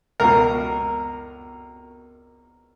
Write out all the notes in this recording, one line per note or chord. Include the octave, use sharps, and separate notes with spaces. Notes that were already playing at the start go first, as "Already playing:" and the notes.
C#2 B2 A#4